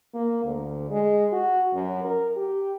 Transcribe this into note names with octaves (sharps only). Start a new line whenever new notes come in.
A#3
D2
G#3
F#4
F#2
A#4
G4